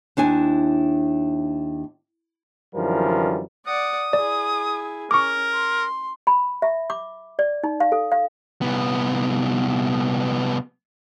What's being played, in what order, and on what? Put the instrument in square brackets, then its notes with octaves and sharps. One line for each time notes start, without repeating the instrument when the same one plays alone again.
[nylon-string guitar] D#2 D4 E4 G#5
[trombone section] F#2 D3 E3 F3 G3 A#4
[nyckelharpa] D5 F#5 [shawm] D#6
[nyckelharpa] E4 G#4 [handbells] D5
[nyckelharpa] C#4 [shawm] A#4 [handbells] C#6 D6
[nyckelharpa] C6
[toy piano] B5
E5
D6
D5
D#4
F5
A4
F5
[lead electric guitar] C2 B3